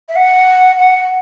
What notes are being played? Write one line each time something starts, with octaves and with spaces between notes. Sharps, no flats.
E5
F#5
F#5